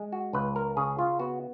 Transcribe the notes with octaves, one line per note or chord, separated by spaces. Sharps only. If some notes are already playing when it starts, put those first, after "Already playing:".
Already playing: G#3
F#4
C#2 B4
A#4
C#3 G#4
F4
B3 F#4